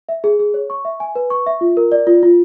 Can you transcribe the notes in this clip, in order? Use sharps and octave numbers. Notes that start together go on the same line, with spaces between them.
E5
G#4
G#4
C#5
C#6
E5
G#5
B4
C#6
E5
F4
A#4
D5
F4
F4